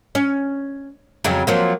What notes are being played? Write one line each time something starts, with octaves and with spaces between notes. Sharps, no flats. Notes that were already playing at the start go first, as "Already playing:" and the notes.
C#4
F2 C#3 F#3
F3 F#3 A#3